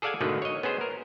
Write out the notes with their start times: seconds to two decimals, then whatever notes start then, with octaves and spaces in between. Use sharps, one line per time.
0.02 G#4 A4 D5 F5 F#5 G#5
0.20 G#1 B2 D3 D#3 A3 B4
0.42 C#5 D#5
0.63 B3 C#4 G#4 C5
0.81 A#4